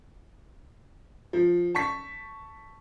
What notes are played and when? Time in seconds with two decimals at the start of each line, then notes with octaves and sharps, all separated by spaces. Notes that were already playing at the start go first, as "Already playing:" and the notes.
1.33 F3
1.75 A5 C#6 B6